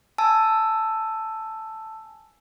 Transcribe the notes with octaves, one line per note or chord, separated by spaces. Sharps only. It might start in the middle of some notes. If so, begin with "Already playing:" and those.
G#5 A5 E6